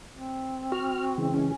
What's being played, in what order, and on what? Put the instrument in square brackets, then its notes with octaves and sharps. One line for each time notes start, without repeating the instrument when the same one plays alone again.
[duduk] C4
[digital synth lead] F#4 [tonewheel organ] F6
[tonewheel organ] C#3 E3 G#3
[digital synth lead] C#4